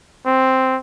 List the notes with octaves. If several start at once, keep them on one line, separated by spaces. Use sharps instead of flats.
C4